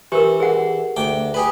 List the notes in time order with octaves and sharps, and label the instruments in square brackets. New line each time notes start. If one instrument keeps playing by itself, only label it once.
[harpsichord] E3 [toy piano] G4 A#4
[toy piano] G#4 F#5
[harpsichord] D2 G5 D6
G4 G#4 B4